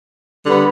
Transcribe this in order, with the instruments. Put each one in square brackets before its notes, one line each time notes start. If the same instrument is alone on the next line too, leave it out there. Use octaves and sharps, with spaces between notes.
[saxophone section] D3 G3 B3